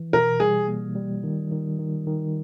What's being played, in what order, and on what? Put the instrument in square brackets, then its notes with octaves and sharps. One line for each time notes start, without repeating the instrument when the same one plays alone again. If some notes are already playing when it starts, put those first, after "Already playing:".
Already playing: [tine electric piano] E3
[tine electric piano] B2 [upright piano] A#4
[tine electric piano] G3 [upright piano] G#4
[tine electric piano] A#3
G3
D#3
D#3
D#3
D#3